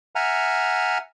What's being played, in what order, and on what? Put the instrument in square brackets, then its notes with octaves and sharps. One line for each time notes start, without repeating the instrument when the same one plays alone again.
[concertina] E5 F#5 G#5 A#5 F6